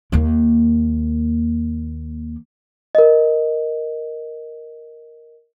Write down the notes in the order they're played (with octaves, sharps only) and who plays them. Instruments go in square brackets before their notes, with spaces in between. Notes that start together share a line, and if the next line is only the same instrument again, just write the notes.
[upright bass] D#2 A#3
[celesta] A#4 D#5